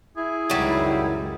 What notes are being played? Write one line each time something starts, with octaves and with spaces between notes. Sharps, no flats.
E4 G#4
C#2 F#2 D#3 F#3 G3